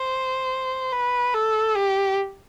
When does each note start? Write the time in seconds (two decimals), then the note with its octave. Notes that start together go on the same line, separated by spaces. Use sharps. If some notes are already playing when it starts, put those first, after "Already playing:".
Already playing: C5
0.92 B4
1.34 A4
1.77 G4